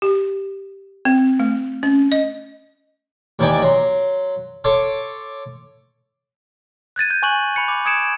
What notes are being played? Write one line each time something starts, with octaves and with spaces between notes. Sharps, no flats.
G4
C4
A3
C#4
D#5
D#2 E3 D#4 D5 G5 G#5
F#3 C6
A4 C#5 C6 D6
F#6 G#6 A6 D#7
G6
G#5 C#6 F#6 F#7
B5 C#7
D6
D#6 G#6 C#7 D7 E7